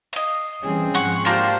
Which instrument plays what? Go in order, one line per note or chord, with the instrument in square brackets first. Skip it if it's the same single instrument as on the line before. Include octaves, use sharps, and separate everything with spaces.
[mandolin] D#5 F5
[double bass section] E3 G3 C#4 [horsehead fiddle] C4 G#4
[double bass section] G#2 F3 [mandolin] C#5 F#5 C6
[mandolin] A#3 D4 [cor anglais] F4 [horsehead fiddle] G4 C5